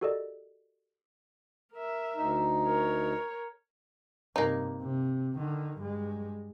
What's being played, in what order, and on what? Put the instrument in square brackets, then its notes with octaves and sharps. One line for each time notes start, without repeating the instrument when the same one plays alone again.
[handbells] F#4 G4 A4 A#4 D5 D#5
[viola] A#4 E5
[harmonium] D2 D#4
[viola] A#4 C#5
[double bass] G2 C3 [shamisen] A#3 D#4
[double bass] C3
D3 D#3
G2 G#3